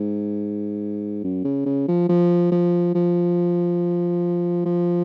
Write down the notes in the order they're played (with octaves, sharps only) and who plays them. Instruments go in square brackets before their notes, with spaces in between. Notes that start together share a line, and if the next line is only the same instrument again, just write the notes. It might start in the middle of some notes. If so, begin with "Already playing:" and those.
Already playing: [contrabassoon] G#2
F#2
C#3
C#3
F3
F3
F3
F3
F3